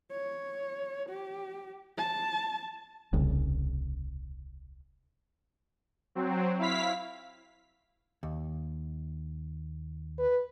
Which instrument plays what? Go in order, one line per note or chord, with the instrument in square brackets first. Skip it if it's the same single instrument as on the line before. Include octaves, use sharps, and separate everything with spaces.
[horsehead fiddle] C#5
G4
A5
[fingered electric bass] D#1 C2 C#3
[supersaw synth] F#3 C4
E4 F5 B6
[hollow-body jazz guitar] D#2
[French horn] B4